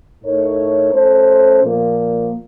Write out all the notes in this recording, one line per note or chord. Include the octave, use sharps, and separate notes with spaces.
A2 A3 D#4 A#4 C#5
A3 C#4 A4 C5
A#2 F3 A#3